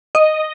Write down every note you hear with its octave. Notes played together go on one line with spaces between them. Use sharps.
D#5